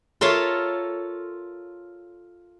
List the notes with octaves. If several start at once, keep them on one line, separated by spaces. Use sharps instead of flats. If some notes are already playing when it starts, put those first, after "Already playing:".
F4 A4 A#4 C#5 E5 F5